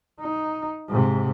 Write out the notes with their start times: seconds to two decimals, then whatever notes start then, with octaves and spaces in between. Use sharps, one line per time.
0.21 D#4
0.89 G#2 C3